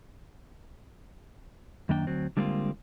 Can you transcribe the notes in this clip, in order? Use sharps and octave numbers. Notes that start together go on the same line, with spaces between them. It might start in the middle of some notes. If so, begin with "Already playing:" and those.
F#2 D#3 A#3 D4 G5
D2 F#3 C4
D3 G3 G#3 A#3 C4 F4